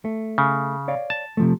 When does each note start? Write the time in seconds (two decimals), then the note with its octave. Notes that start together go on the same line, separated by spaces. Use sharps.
0.05 A3
0.38 C#3
0.88 C#5 D5 F5
1.10 A5
1.37 C3 F3 A3